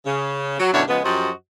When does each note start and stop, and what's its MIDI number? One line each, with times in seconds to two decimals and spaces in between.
0.05 0.56 49
0.59 0.70 54
0.73 0.82 42
0.73 0.82 47
0.73 0.82 50
0.73 0.82 62
0.73 0.82 64
0.73 0.82 73
0.88 0.99 49
0.88 0.99 53
0.88 0.99 56
0.88 0.99 59
1.04 1.30 42
1.04 1.30 53
1.04 1.30 66
1.04 1.30 67
1.04 1.30 72
1.04 1.30 75